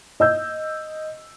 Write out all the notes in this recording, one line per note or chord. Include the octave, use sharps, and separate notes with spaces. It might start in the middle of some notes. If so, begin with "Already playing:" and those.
D#5 E6 G6